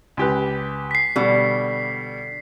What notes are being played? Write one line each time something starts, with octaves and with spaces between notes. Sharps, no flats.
C#2 G4 B4
B6 C7
B2 D3 G3